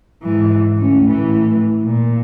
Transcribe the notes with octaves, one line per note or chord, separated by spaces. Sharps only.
G#2 E3
D2 C#4
A2 E3
A#2